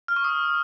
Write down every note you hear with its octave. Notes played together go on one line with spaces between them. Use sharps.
F6
C#6
D#6